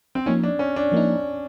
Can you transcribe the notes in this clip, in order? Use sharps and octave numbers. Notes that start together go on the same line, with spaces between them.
C4
F3 A#3 C#4 D#4
D4
C#4
D4
F3 A#3 D#4